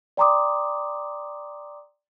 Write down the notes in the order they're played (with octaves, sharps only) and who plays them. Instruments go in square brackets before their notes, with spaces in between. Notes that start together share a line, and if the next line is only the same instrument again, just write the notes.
[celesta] D5 G5 A#5 C6 D6 D#6